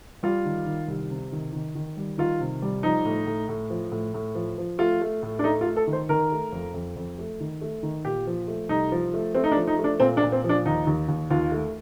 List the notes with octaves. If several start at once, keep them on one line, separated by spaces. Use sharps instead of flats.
G3 F4
D#3
D#3
C2
C3
D#3
D#3
D#3
G3
D#3 F4
C3
G3
F3 D#4
A2
A2
A2
F3
A2
A2
F3
F3
A3 F4
A3
A2
D4
A3 D#4
F4
A3
A4
D#3
C5
D#3 A#4
A3
F2
F2
F2
A3
D#3
A3
D#3
A#2 G4
F3
A3
C2 D#4
F3
A3
A3 C4
D#4
D4
F3
D#4
A3
D4
A#2 C4
D4
A#2
C4
F3
D4
D#2 D#4
D#2
D#2
D#2 F4
A3